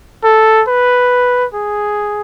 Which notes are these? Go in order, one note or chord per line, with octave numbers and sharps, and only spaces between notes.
A4
B4
G#4